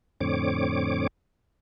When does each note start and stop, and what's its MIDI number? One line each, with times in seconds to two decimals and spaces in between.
0.21 1.07 41
0.21 1.07 45
0.21 1.07 50
0.21 1.07 60
0.21 1.07 73
0.21 1.07 86